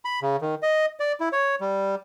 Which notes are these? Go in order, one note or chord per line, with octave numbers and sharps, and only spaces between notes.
B5
C#3
D#3
D#5
D5
E4
C#5
G3